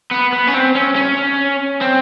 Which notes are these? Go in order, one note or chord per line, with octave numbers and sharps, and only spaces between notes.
B3
B3
C#4
C4
C#4
C#4
C4